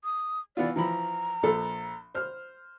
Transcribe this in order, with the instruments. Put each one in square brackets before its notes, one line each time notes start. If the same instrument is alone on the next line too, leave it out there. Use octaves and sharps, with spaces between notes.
[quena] D#6
[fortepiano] E3 B3 F4 [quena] D5
[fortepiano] E3 F3 B5 [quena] A#5
[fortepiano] A#1 F3 A4
C5 F6